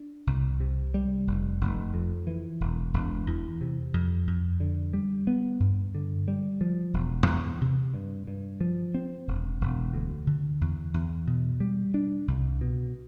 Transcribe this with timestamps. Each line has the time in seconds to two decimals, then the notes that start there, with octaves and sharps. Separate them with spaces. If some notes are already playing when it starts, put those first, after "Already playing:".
Already playing: D4
0.27 C2
0.60 C3
0.94 G3
1.27 F1
1.61 F1
1.94 F2
2.27 E3
2.60 E1
2.94 E1
3.27 E2
3.61 C3
3.94 F2
4.27 F2
4.60 D3
4.93 G3
5.27 B3
5.60 G2
5.95 D3
6.28 G3
6.61 F3
6.93 E1
7.27 E2
7.61 C3
7.94 G2
8.27 G2
8.61 F3
8.94 C4
9.28 E1
9.61 E1
9.93 D2
10.27 D3
10.61 E2
10.94 E2
11.27 B2
11.60 G3
11.94 D4
12.28 C2
12.61 B2